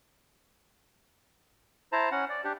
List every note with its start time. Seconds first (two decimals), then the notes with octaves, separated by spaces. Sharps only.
1.92 E4 C5 A5 A#5
2.11 C#4 F#5
2.29 D5
2.44 D4 G4